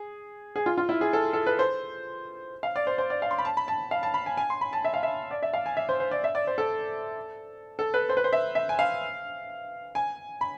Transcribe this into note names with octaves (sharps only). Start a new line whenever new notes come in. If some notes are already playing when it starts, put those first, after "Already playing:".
Already playing: G#4
G#4
F4
F4
E4
G#4
A4
A4
B4
C5
F5
D5
C5
C5
D5
F5
C6
B5
A5
B5
A5
F5
A5
B5
G#5
G#5
C6
B5
A5
E5
F5
E5
D5
E5
F5
G#5
E5
C5
C5
D5
E5
D5
C5
A4
A4
B4
C5
B4
C5
E5
E5
G#5
F5
G#5
B5